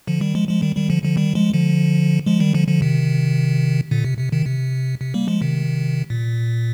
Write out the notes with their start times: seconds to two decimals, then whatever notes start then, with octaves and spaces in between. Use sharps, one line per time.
0.07 D3 F3
0.21 D#3 G3
0.35 F3 G#3
0.49 F3 G#3
0.62 D#3 G3
0.76 D#3 G3
0.90 D3 F3
1.04 D3 F3
1.17 D#3 G3
1.35 F3 G#3
1.54 D3 F3
2.26 F3 G#3
2.40 D#3 G3
2.54 D3 F3
2.68 D3 F3
2.82 C3 D#3
3.91 A#2 D3
4.05 C3
4.19 C3
4.32 C3 D#3
4.46 C3
5.01 C3
5.14 G3 A#3
5.28 F3 G#3
5.41 C3 D#3
6.10 A#2